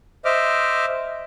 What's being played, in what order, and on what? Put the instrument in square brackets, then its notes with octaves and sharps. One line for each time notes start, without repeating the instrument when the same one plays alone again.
[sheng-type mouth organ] C5 D#5 E5 D6 F6